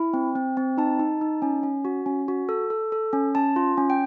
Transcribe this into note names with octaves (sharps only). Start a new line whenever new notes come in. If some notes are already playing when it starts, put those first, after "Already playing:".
Already playing: E4
C4
C4
C4
D#4 A5
D#4
D#4
C#4
C#4
F#4
C#4
F#4
A4
A4
A4
C#4
C#4 A5
F4
C#4
G5